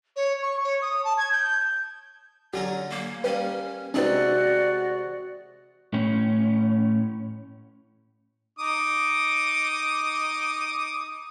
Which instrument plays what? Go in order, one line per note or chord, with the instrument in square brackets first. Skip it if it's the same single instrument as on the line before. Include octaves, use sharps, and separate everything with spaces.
[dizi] C#5
C#6
C#5
D#6
A5
G#6
G6
[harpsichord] D3 C#4 A#5 [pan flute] F#3 [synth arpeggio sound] G4
[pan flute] A#3
[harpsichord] G3 A#3 [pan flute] C#4 [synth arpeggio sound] B4
[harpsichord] C3 G#3 A4 [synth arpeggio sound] C#4 D#4 B4 [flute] F#4 [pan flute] D5
[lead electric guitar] A2 C#4
[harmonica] D#4 D6 D#6